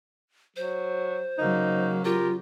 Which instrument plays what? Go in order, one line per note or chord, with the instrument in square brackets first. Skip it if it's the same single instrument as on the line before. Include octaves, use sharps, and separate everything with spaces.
[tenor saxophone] F#3 [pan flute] C5
[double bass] C#3 F#3 [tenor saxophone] A#3 [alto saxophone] D#4
[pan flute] F4 [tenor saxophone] G4 [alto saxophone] A#4